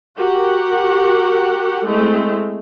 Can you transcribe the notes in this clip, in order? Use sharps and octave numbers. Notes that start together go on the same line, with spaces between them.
F#4 G4 A#4 F#5
G#3 A3 C4 E4